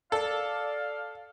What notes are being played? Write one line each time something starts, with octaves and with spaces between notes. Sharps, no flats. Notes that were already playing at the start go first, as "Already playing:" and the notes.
A4 D5 F5